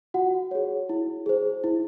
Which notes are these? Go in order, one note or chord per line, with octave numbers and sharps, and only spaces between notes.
F4 F#4 F#5
G#4 C#5
E4
G#4 C5
E4